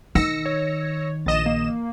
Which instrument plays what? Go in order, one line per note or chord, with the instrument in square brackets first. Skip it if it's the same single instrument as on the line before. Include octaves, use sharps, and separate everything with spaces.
[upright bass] D#3 [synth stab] E6 A#6 C#7
[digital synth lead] C#5
[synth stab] A#1 D#5 E7 [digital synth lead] A6
[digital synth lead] A#3